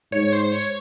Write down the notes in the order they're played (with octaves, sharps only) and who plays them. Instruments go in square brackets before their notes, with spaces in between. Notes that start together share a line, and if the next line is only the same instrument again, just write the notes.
[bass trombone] G#2 [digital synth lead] C#5
[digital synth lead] C5
C#5